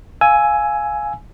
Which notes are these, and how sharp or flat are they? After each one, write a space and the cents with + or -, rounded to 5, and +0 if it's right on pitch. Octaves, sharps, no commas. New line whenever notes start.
F5 +0 G#5 +10 E6 +0